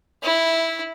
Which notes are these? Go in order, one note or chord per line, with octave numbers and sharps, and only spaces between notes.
E4